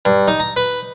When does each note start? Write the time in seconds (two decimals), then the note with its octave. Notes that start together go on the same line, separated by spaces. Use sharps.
0.05 G2
0.28 D#4
0.40 A#5
0.56 B4